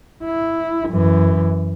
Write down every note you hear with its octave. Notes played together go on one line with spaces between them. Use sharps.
E4
F#2 E3